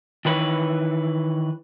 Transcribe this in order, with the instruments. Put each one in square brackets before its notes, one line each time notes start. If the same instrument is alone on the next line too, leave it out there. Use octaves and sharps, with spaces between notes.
[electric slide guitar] D#3 E3 B4 C#5